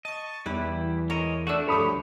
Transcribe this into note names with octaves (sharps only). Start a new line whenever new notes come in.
D#5 A5 C#6
E2 G3 E4 G4 B4
G#3 A#4 C#5 D#5
A3 D4 F#4 E5 E6
D2 G2 F3 G4 A4 C#5 B5 D#6